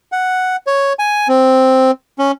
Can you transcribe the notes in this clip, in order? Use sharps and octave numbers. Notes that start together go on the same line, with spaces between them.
F#5
C#5
G#5
C4
C#4